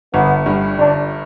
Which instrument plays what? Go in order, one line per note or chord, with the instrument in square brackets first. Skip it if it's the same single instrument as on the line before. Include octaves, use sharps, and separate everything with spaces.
[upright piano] G1 [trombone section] B3
[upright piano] G2 G3
[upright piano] G1 [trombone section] D4